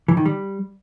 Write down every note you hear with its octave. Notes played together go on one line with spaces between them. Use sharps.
E3
D#3
G3